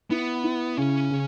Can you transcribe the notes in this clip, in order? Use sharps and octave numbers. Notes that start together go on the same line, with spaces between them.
B3 E4
E4
C#3 C#4
C#3